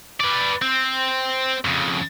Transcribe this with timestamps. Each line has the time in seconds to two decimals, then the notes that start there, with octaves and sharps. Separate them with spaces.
0.20 B4 D5
0.62 C4
1.65 F2 C#3